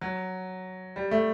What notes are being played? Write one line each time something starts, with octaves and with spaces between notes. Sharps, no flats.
F#3
G3
A3